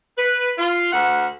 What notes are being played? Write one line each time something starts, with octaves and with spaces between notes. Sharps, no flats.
B4
F4
D2 F#5